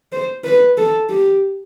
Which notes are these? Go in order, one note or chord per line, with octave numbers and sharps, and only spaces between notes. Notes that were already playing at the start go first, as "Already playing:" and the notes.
C5
B4
A4
G4